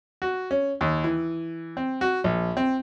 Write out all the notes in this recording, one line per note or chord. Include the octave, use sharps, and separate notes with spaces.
F#4
C#4
D#2
E3
C4
F#4
A#1
C4